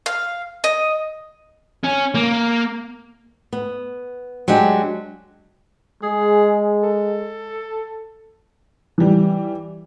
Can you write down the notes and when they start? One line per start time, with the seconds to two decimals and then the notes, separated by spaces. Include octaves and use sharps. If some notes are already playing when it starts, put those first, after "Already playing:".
0.06 F5
0.64 D#5
1.84 C#4
2.15 A#3
3.53 B3
4.48 F#3 G#3 D4 G4
6.03 G#3 G#4
6.83 A4
8.98 E3 G3